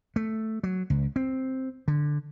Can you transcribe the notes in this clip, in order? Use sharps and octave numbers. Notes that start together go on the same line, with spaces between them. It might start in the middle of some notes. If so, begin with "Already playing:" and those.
A3
F#3
C#2
C4
D3